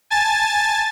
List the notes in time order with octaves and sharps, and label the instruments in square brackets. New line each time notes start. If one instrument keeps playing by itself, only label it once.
[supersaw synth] G#5 A5 A6